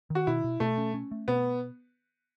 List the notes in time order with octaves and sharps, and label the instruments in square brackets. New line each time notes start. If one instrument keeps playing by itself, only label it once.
[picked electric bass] D#3
[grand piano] F#4
[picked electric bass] B2 [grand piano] E4
[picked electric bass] B2
[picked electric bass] B2 [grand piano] A3
[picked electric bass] C#4
C#4
A3
[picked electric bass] B2 [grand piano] B3